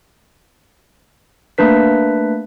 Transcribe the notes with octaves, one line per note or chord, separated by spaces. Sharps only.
A3 A#3 D4 B4 B6